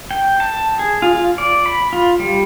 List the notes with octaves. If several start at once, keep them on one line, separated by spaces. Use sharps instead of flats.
G5
A5
G#4
F4
F4
D5
B5
F4
G3